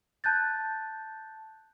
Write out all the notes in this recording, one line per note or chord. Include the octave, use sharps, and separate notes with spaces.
A5 F#6 G6 A6